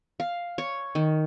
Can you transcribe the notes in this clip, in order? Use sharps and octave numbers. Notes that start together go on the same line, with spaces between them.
F5
C#5
D#3